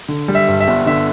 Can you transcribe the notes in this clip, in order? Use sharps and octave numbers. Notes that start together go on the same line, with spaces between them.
D3
G3
E5
G2
E5
G1
D3 E5